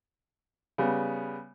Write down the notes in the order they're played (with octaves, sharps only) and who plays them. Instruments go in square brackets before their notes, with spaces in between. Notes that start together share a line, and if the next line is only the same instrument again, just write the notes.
[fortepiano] C#3 G3 B3